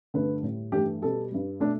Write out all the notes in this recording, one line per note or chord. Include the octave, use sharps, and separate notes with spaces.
G2 D3 A3 B4
A2 G3
G2 E3 A3 G4
B2 G3 A4
G2 G3
B2 A3 D4